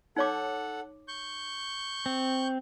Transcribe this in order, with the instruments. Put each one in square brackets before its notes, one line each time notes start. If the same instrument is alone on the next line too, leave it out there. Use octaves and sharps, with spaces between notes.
[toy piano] D#4 C#5 D6 [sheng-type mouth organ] A4 F#5
[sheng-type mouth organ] C#6 G6
[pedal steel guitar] C4